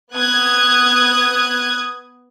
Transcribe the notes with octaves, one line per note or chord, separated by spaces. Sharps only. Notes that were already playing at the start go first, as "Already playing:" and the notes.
B3 D#6 F#6 G#6